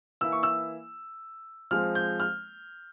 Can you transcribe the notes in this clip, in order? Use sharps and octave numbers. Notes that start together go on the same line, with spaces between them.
E3 A#3 E4 E6
C#6
E6
F3 G#3 C4 F6
G6
F6